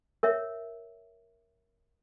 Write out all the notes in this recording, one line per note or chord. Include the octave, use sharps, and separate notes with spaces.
A#4 C#5 E5